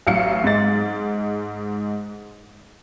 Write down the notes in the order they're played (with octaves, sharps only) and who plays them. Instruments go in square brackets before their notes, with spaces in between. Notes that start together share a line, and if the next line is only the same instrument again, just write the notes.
[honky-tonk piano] A1 F#3 F5 C#7
G#2 G#3 A6